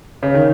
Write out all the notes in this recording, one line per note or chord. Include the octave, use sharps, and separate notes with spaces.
C#3
D#3